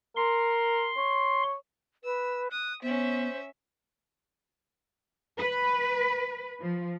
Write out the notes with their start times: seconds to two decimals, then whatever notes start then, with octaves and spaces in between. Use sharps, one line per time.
0.16 A#4 C6
0.98 C#5
2.04 B4 E6
2.51 D#6 F#6
2.82 B3 C#4 C5 E5
5.38 B4
6.61 F3